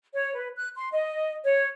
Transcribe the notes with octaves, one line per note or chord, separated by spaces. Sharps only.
C#5
B4
F#6
C6
D#5
C#5